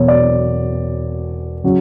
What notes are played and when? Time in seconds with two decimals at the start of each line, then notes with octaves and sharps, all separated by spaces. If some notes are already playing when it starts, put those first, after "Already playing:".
Already playing: E1 E2 B2 F#3 C#5
0.08 D5
1.64 C#3 F#3